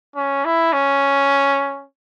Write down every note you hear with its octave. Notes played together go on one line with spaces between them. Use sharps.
C#4
E4
C#4